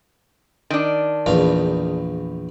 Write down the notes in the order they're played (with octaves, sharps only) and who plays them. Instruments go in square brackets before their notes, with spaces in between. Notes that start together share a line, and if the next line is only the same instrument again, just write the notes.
[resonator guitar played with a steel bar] D#3 D4
[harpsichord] A#1 E2 F4